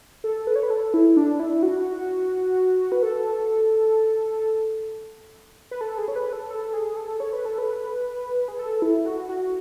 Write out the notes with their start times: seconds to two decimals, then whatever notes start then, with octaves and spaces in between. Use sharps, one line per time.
0.24 A4
0.47 B4
0.56 C#5
0.63 B4
0.70 A4
0.94 E4
1.17 D4
1.40 E4
1.63 F#4
2.92 B4
3.03 A4
5.71 B4
5.81 A4
5.98 G#4
6.08 C#5
6.16 B4
6.33 A4
6.50 A4
6.74 G#4
6.97 A4
7.20 C#5
7.33 B4
7.45 A4
7.58 B4
8.48 G#4
8.59 A4
8.82 E4
9.06 F#4
9.29 F#4